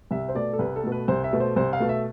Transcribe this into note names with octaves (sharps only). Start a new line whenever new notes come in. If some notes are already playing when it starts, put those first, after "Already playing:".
C2 E5
C5
B2 A3 D5
A4
C2 B4
A4
B2 A3
B4
C2 C5
E5
B2 A3
C5
C2 C5
F5
B2 A3
E5